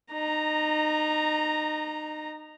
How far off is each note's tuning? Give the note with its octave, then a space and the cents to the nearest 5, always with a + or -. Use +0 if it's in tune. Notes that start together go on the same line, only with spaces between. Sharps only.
D#4 -25 A#5 +0